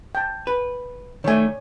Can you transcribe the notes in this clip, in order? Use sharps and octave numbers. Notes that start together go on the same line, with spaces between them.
G5 A5
B4
D#3 A3 C#5 D5 G#5